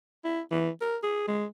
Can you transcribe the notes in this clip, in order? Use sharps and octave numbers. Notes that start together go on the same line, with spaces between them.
E4
E3
A#4
G#4
G#3